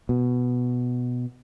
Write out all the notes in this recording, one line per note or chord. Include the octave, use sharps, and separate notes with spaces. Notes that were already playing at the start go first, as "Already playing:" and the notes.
B2